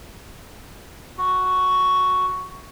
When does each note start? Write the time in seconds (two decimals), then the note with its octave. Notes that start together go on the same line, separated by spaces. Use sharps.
1.18 F#4